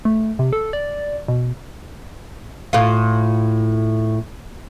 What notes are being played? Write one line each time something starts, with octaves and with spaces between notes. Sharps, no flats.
A3
C3
A4
D5
B2
A2 F4